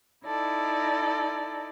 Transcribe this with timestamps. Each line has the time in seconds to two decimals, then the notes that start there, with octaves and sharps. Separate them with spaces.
0.26 D#4 E4 A4 D5